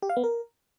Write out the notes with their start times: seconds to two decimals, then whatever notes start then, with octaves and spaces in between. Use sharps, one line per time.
0.02 G4
0.10 F5
0.17 B3
0.24 A#4